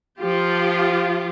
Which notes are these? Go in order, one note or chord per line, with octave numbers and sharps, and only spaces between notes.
F3 F4 G4